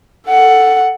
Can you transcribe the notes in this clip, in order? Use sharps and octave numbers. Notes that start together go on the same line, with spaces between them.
A4 F#5